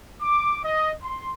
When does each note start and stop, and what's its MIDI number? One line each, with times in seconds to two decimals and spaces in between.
0.20 0.57 86
0.64 0.92 75
1.03 1.31 84